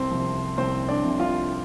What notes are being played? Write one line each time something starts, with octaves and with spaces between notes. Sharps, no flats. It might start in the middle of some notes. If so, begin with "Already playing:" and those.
Already playing: C2 C4 C5
C3 F3
C2 C4 C5
D4 D5
C3 F3
F4 F5